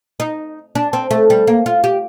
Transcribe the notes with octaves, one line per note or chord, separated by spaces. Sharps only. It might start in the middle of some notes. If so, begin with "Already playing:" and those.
D#4
D4
C4
A3
G3
A#3
F4
G4